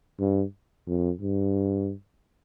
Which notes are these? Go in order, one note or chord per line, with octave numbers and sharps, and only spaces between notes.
G2
F2
G2